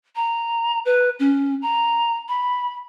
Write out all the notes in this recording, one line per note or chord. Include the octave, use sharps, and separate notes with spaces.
A#5
B4
C#4
A#5
B5